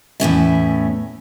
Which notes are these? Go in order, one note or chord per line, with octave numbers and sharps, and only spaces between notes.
E2 A2 C#4 E5